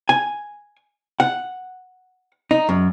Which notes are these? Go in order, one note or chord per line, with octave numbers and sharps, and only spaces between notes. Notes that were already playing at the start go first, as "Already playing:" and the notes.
G#5
F#5
D#4
F#2